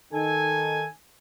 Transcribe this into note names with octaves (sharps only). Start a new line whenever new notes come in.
D#3 D#4 A4 G#5